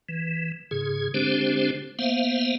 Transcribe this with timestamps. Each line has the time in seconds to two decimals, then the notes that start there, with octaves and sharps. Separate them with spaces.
0.09 E3
0.71 G#2 C#3 G#4
1.14 D3 G#3 C4 D4 G4 C5
1.99 A#3 B3 C5 E5 F5